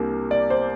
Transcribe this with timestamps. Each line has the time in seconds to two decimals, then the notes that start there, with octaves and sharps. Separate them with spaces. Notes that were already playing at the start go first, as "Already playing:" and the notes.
Already playing: C2 C3 A#3 D4
0.31 D5
0.50 C5